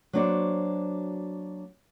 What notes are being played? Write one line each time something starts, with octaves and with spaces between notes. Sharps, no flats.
F#3 A#3 D4 F#4 C5 D5